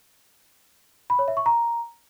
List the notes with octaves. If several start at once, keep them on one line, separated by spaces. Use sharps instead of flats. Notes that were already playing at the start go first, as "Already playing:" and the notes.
B5
C#5
E5
C#6
A#5